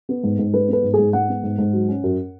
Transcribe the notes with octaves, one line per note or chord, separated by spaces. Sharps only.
B3
G#2
G#2
G#3 B4
B3 B4
G#2
G#2 G#4
G#3 F#5
B3
G#2
G#2
F#3
C#4
F#2